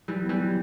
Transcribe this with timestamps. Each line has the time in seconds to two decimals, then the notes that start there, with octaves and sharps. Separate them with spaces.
0.08 E3 F#3 G3
0.24 B3
0.29 E3 G3
0.40 F#3